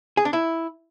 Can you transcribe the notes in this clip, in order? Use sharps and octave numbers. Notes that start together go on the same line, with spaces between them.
G#4
D4
E4